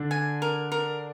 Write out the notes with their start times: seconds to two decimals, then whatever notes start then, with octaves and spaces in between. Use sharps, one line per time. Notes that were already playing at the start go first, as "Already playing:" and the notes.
Already playing: D3 D4
0.11 G#5
0.42 A#4
0.72 A#4